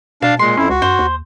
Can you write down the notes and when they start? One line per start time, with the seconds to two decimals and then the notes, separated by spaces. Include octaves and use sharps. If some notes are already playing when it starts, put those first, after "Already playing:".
0.22 B2 D4 F5 A5
0.39 A#2 G#3 C6
0.57 F2 C#4 E4
0.69 C#2 F#4
0.82 F#2 C5
0.99 D#2